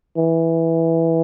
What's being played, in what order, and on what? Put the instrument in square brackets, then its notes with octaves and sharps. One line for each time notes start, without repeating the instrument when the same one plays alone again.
[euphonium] E3